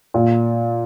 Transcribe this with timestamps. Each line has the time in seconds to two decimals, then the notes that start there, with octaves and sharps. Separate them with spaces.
0.14 A#2